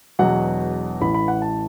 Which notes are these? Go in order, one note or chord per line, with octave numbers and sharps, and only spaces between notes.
E1 E2 B2 F#3 F#5
A1 A2 E3 B5
B5
F#5
A5